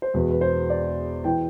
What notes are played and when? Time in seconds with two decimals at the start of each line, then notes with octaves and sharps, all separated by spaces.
0.02 C5
0.14 E1 E2 B2 B4
0.30 B4
0.41 C5
0.70 D5
1.24 E3 G5